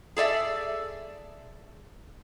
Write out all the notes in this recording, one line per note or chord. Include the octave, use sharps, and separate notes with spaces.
G#4 A4 D5 E5